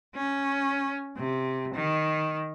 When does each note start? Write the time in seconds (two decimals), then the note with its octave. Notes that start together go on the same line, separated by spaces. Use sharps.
0.16 C#4
1.17 C3
1.74 D#3